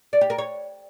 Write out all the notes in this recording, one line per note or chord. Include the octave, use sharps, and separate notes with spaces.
D5
G4
A#4
C#5